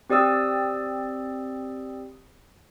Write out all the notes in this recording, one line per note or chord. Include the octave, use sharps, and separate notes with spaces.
C4 G4 D5 D#6 E6